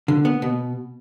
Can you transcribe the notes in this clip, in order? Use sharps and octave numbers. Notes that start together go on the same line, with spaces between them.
D3
B3
B2